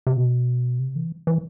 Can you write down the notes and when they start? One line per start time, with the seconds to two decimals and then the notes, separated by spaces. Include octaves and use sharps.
0.07 C3
0.16 B2
0.79 C3
0.95 E3
1.27 E3